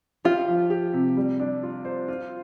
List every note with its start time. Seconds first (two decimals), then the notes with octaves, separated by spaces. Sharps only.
0.25 F4 G4
0.48 F3
0.70 G4
0.93 C3
1.17 G3
1.40 D4
1.63 F4
1.85 C5
2.08 F4